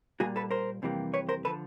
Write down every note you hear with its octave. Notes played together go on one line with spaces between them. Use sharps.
A#2 G3 A#3 F#4 G#4
A4 B4
A#4 C5
F2 C3 E3 G3 A#3
B4 C#5
A#4 C5
D3 F3 A4 B4